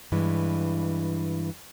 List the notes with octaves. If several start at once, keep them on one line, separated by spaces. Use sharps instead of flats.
G2 E3 G#3